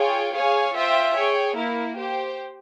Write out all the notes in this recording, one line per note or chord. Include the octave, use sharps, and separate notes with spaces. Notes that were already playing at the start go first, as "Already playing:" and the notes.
Already playing: F4 G#4 C#5 G5
G#4 C#5 F5 G#5
F4 C5 E5 G5
G#4 C#5 G5
A#3 E4 A#4
G4 C5 G5